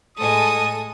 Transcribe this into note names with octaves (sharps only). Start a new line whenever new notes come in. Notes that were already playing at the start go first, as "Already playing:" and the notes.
A2 G#3 A4 G#5 D#6 D#7